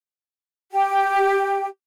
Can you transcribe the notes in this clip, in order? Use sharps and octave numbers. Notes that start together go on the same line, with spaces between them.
G4 G5